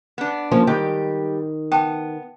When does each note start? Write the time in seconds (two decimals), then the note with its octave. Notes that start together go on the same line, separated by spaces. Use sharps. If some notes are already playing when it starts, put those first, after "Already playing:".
0.18 B3 D4
0.51 F3 A#3 C#4
0.67 G#2 D#3 G3 G4
1.72 B3 G5 A5